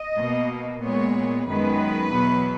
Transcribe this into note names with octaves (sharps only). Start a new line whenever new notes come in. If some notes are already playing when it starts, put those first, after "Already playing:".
Already playing: D#5
B2 A#3
A#2 G#3 B3 C#5
F#2 D#3 G#3 B3 B4
E2 B2 F#3 B3